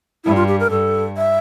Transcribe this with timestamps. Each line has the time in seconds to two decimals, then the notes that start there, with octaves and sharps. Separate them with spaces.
0.24 G2 E4
0.36 F4
0.48 G4
0.60 A#4
0.70 G2 A4
1.17 E5